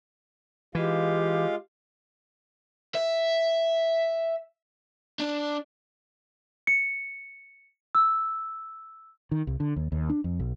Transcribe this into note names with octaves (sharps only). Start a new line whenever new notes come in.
E3 G#3 F4 G4 F5
E5
D4
C#7
E6
D#3
C2
D3
D#2
D#2
D4
F2
B1